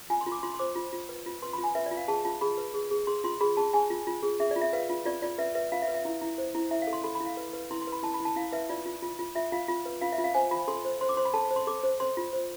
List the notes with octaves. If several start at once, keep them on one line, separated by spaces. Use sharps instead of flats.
F4 G#5
C6
F4
D6
F4 C6
C6
C5 D6
F4
F4
B4
F4
B4 C6
B5
F4
G#5
B4 E5
D5
F4
F5
G#4 A5
F4 A5
G#4 B5
B4
G#4
G#4
G#4 C6
F4 C6
G#4 B5
G#4 A5
G#4 G#5
F4
F4
G#4
G#4 E5
D5
F4
E5
B4 F5
F4
F4 D5
F4 D5
B4 E5
B4 E5
F4 F5
E5
B4
E5
E4
E4
C5
E4
E4 E5
F5
A4
C6
A4 B5
B5
E4
F5
B4
B4
E4 C6
C6
B4
B5
E4 A5
B5
E4
A5
E4 F5
B4 E5
F4 D5
F4
F4
F4
F4 E5
F4 F5
F4
B4
F4 F5
E5
F4
F5
C5 G#5
F4 B5
A4 C6
C5
C5 C6
D6
C5 C6
B5
A4 A5
A5
C5
C6
A4 D6
C5
C5 C6
F4
C5